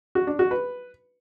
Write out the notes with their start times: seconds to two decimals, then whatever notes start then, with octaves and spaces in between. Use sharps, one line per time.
0.15 F#4
0.27 D4
0.39 F#4
0.51 B4